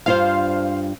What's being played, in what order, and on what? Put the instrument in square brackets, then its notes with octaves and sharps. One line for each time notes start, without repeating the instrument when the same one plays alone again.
[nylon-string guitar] G2 D4 F4 [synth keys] C5 F5